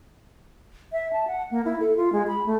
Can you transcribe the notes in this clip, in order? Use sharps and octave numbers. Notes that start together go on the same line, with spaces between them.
E5
A5
F#5
A#3
E4
A4
F4
G#3
B5
A3